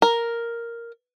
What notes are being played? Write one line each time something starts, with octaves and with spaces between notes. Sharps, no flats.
A#4